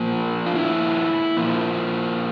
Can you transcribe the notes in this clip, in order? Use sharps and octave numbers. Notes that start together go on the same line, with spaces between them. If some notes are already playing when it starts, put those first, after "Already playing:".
Already playing: A#2 F3 A#3
F4
E4
A#2 F3 A#3